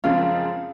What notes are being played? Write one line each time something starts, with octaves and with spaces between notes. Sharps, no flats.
F#2 C#3 F3 G#3 C4 F4